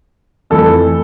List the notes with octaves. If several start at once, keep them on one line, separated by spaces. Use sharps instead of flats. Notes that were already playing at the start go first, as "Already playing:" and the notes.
F2 E3 A3 A4